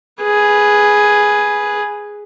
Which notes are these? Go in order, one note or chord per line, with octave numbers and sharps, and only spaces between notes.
G#4 B4